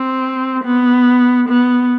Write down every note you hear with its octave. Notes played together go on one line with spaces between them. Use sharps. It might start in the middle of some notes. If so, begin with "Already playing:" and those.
Already playing: C4
B3
B3